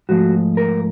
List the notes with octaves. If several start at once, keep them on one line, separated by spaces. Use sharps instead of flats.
G#2 F3 A3 F#4
A#4